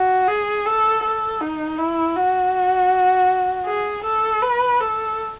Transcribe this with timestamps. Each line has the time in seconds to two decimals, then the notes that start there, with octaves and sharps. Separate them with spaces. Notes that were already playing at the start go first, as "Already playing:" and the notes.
Already playing: F#4
0.28 G#4
0.66 A4
1.03 A4
1.41 D#4
1.78 E4
2.16 F#4
3.66 G#4
4.04 A4
4.42 B4
4.80 A4